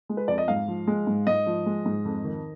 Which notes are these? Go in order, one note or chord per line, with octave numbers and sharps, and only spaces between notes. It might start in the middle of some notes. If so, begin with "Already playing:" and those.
G#3
B4
F2 D5
D#5
G#2 F5
F3
G#3
G#2
G#2 D#5
F3
G#3
G#2
F2
D#3